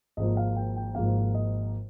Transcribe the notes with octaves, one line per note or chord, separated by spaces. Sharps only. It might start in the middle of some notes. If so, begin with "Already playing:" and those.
G#1 G#2 F3 A#3 D#5
F5
G5
G5
G#1 G#2 F3 A#3 F5
D#5